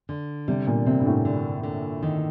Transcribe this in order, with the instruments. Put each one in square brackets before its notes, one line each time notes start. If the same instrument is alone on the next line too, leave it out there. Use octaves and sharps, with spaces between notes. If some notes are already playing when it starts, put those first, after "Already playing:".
[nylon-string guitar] D3
[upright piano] C3 [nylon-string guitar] G3
[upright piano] A#2
[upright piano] C3 [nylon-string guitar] C4
[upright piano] G2
A2
[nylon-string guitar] D3
D3
D#3